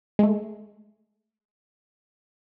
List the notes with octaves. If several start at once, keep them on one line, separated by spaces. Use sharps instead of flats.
G#3 A3